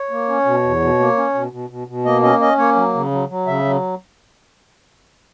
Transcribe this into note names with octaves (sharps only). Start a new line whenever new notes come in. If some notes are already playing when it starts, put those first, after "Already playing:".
Already playing: C#5
A#3
C#4
B2
E2
B2
A#3
C#4
B2
B2
B2
B2
A#3 D#5
C#4 D#5
C#4 D#5
A#3 C#5
F#3
C#3
F#3
F#3
C#3 E5
F#3